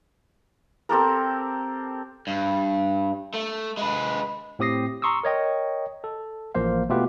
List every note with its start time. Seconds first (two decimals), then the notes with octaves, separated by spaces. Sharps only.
0.89 C4 G4 A4 A#4
2.27 G2
3.34 A3
3.77 G#3 B4
4.59 A2 C4 G4 D#6 A#6 C7
5.02 A#5 C6 C#6 D#6 E6
5.24 A#4 C#5 D#5 G5
6.04 A4
6.55 A1 F3 A#3 C5 F5
6.89 B2 A3 B3 F4 G4 B4